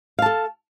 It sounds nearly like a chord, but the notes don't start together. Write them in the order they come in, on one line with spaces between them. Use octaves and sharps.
F5 A5 A4